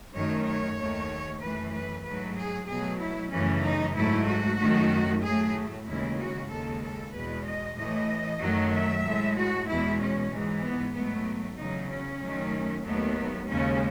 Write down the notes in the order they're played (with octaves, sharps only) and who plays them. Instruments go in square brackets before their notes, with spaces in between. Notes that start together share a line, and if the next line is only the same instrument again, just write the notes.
[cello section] F#2 D#3 A3 C#5
C#5
D#2 D#3 A3
F#2 E3 A3 B4
B4
G#2 F#3 A3 B4
G#4
B2 F#3 A3 G#4
E4
F#2 C#3 E3 A3 C#4
D#4
G#2 F#3 A3 E4
F#4
F#2 D#3 A3
A2 F#3 A3 G#4
D#2 C#3 E3 G#3 E4
F#4
D#2 C#3 G#3 A4
A4
E2 B2 G#3 B4
D#5
A2 E3 A3 D#5
F#2 D#3 F#3 A3
E5
A2 G#3
F#4
E2 B2 G#3 E4
C#4
G#2 E3 G#3
B3
G#2 F#3 A3 B3
E2 C#3 F#3 D#4
C#4
F#2 D#3 F#3 A3
D#2 D#3 F#3 A3 B3
D#2 C#3 G#3 C#4